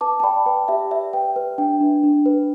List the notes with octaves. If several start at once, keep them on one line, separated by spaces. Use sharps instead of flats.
B4 A5 D6
A5
D5 G5 B5
B4 G5
G4 E5
D5 E5
B4 G5
B4
D4 G5
D4
D4
B4